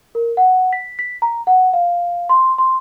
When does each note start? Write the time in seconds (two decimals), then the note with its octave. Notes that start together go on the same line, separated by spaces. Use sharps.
0.15 A#4
0.37 F#5
0.73 B6
0.99 B6
1.22 A#5
1.47 F#5
1.73 F5
2.29 C6
2.58 C6